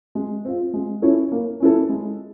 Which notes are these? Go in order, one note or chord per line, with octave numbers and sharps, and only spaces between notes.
G#3
C4 F4
G#3
C#4 E4 A4 C#5
A#3
C#4 E4 A4
G#3